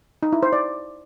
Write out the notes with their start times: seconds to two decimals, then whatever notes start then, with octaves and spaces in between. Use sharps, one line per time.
0.23 D#4
0.33 E4
0.43 C5
0.53 D5